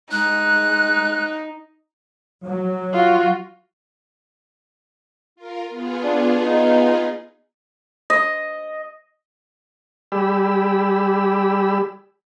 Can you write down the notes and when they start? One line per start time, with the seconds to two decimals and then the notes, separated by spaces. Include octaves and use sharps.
0.11 G#3 D#4 F#6
2.45 F#3
2.93 F4 F#4
5.36 F4 A#4
5.69 B3 F4 G#4
6.02 D4
6.44 D#4
8.10 D#5
10.12 G3 G4 G#4 D5 B5 E6